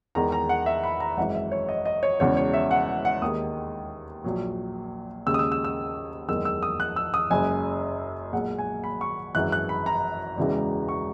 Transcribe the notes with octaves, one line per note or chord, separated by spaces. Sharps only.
E2 D#3 G#3 A#5
A#5
F#5
E5
B5
A#5
G#1 F#2 E3 G#3 F#5
E5
C#5
D#5
D#5
C#5
E1 E2 C#3 C#5
C#5
E5
F#5
F#5
D#2 D#3 G#3 D#6
A#1 A#2 F#3
D#2 C#3 G#3 E6
D#6
E6
E6
E6
F#1 E2 D#3 G#3 E6
E6
D#6
F#6
E6
D#6
F#1 F#2 C#3 G#3 G#5
B1 A#2 G#3 F#5
G#5
B5
C#6
G#1 F#2 E3 G#3 F#6
F#6
B5
A#5
E1 E2 C#3 E3 G#3
C#6